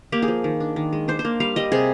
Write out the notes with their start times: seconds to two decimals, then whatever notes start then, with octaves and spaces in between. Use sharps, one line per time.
0.12 A#3 G4
0.22 G#4
0.28 F3
0.44 D#3
0.60 D4
0.76 D#3
0.93 G#3
1.08 D4 C5
1.19 C5
1.25 A#3
1.40 G3 F5
1.56 G3 D#5
1.72 C3 G#4